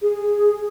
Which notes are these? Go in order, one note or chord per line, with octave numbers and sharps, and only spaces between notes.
G#4